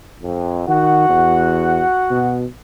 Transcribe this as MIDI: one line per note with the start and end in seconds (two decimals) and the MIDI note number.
0.23 0.65 41
0.68 1.06 51
0.68 2.42 66
0.68 2.42 78
1.09 1.83 40
2.10 2.45 47